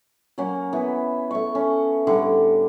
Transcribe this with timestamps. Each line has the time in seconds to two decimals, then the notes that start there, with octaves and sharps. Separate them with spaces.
0.38 F#3 A#3 C#4
0.73 E3 B3
1.31 A3 C#6
1.55 C#4
2.07 A2 D3 G3